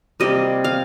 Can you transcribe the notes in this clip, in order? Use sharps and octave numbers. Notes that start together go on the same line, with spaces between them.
C3 G3 A#3 D#5
F5